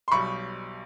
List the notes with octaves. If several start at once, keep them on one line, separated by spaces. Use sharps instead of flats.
C6
B1 B2 G3 B5 C#6